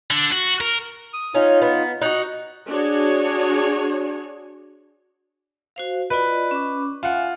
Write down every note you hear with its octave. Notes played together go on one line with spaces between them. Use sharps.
D3
F#4
A#4
D#6
C#4 D#4 F4
B3
D#4 F#4 F#6
D4 F#4 G#4 C#5
F#4 C5 F5
F4 B4 D5 D#5
C#4 D6
F4 E5 F#5 G#5